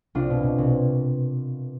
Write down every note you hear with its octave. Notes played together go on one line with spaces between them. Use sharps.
C2 D4 F4
B2
B2
C2